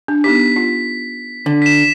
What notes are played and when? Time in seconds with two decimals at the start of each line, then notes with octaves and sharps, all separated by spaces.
0.08 D4
0.24 B3 D#4 G4 B6
0.56 F4
1.46 D3
1.62 B6 E7